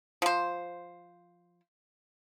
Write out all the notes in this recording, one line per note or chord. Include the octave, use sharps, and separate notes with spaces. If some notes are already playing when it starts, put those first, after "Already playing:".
F3 C5